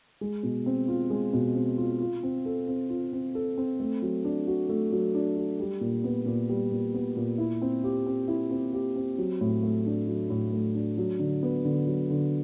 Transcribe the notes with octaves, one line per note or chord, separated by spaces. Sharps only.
G#3
B2
C4
F4
G#3
B2
C4
F4
F4
C4
A4
C4
F4
C4
A4
C4
A3
F#3
D4
F#4
A3
F#3
D4
F#4
G3
A#2
B3
A#2
G3
A#2
B3
A#2
E4
C4
G4
C4
E4
C4
G4
C4
F#3
A2
A3
D4
F#3
A2
A3
D4
F#3
D3
B3
D3
F#3
D3